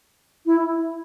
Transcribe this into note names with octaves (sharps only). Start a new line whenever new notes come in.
E4